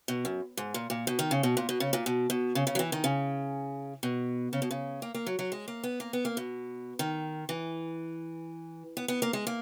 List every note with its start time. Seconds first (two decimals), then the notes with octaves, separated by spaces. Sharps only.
0.08 B2
0.25 F#2
0.57 G#2
0.74 A#2
0.90 A#2
1.07 B2
1.19 D#3
1.31 C#3
1.43 B2
1.57 A#2
1.69 B2
1.80 C#3
1.93 A#2
2.06 B2
2.30 B2
2.55 C#3
2.67 C#3
2.75 F#3
2.79 E3
2.92 D#3
3.04 C#3
4.03 B2
4.53 C#3
4.62 B2
4.71 C#3
5.02 A#3
5.14 A#3
5.26 F#3
5.39 F#3
5.52 G#3
5.68 A#3
5.84 B3
6.00 A#3
6.13 B3
6.25 A#3
6.37 B2
6.99 D#3
7.49 E3
8.97 B3
9.08 B3
9.22 A#3
9.33 G#3
9.47 A#3